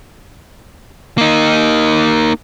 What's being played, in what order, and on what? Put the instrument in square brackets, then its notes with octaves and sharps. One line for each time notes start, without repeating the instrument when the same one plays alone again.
[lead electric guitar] A#3 D#4